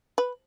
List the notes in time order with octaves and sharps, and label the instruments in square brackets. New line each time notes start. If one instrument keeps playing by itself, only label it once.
[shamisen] B4